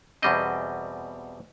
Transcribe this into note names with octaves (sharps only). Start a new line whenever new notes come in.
E2 B2 G3 C4 D#5